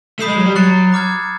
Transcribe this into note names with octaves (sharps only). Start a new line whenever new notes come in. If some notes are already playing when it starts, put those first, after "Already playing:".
A3 B5 D#6 G6 C7 E7
G#3
F#3
G3
F#3 F#6 A6 C#7
A#5 D6 F6 G#6